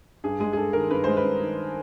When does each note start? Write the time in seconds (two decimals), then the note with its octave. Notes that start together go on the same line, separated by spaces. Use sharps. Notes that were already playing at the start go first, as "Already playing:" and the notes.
0.24 G2 G#4
0.40 G#3 G#4
0.53 G#4
0.57 G2 A4
0.73 D#3 A#4
0.91 G2 B4
1.04 G#3 C5
1.17 B4
1.24 G2
1.41 D#3